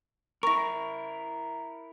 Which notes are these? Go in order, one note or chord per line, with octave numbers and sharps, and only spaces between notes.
E4 A#4 C#6 A#6